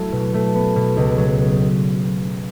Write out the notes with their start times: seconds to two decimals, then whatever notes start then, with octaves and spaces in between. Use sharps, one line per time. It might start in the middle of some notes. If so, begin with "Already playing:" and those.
Already playing: F#3 A3 E4
0.12 B2
0.34 A3
0.55 B3
0.76 B2
0.97 C#2
1.18 F#3